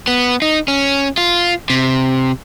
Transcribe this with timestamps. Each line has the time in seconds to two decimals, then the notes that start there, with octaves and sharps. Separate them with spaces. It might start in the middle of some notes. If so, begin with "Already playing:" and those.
0.08 B3
0.42 D#4
0.68 C#4
1.18 F4
1.70 C3